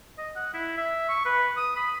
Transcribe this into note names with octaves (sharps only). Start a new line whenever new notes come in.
D#5
F#5
E4
E5
C#6
B4
D#6
B5